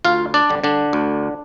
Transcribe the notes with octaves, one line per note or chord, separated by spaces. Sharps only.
D2 F4 F5
D4 D5
D3 G3
D3 D4
D2